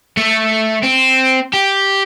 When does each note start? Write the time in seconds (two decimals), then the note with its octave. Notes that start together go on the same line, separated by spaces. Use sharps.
0.17 A3
0.83 C4
1.54 G4